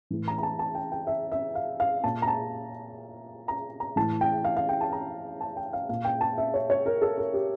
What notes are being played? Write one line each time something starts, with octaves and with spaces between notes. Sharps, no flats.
A2 E3
A#5
A#5
A5
A5
G5
G5
E5
E5
F5
F5
A#2 A5
A#5
A5
A#5
A#5
A2 E3 A5
G5
F5
F5
G5
A5
A#5
A5
G5
F5
A#2 F5
G5
A5
E5
C#5
C#5
A#4
A4
A#4
G4